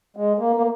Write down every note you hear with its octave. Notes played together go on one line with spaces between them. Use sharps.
G#3
A#3
A#3